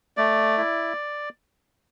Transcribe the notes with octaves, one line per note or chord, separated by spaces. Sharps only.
A3 D5
E4